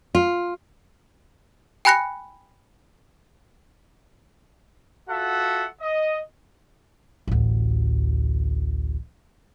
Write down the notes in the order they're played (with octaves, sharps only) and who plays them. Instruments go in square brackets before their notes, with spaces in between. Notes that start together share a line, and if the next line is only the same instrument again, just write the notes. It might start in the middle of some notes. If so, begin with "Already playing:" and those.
[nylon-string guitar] F4
[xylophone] G5 G#5 B5 F#6 A#6 C#7
[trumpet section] F4 F#4 A4 E5 F#5
D#5
[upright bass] A1 D2